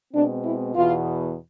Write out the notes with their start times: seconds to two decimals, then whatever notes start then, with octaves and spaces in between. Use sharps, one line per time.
0.13 B2 G#3 C4 D4
0.44 E4
0.75 E2 B2 B3 F4